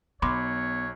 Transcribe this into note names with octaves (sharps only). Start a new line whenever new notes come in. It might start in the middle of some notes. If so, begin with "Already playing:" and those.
B1 B3 C#5 B5 C6 D6